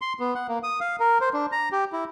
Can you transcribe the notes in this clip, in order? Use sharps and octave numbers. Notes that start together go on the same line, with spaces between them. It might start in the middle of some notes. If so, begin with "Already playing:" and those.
C6
B3
F#5
A#3
D#6
F5
A#4
C5
D4
A#5
G4
E4